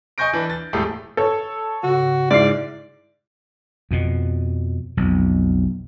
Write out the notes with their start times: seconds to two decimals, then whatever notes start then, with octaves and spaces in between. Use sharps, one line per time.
0.18 D#5 G#5 C#6 G6 A#6 D7
0.33 E3 D4 B4
0.50 A6
0.73 E1 A2 G#3 A3 G4 G#4
1.17 A4 C#5
1.83 G#2 C#3 F#4
2.31 G#2 E4 D5 E5 F6 C7
3.91 F2 B2
4.97 B1 F2